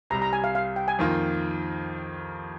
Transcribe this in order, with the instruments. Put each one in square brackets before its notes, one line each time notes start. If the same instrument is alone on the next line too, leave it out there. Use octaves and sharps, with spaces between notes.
[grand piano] C2 C3 G3 [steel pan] A#5
[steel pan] A#5
G#5
F5
F5
G5
G#5
[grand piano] F2 D#3 A#3 F4